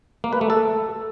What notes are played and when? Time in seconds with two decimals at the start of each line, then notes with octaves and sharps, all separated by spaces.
0.24 A#3
0.33 B4
0.41 A3
0.50 A4